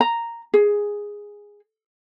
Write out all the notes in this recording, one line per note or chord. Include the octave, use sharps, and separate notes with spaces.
A#5
G#4